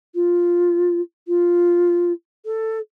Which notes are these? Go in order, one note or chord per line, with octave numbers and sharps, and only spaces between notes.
F4
F4
A4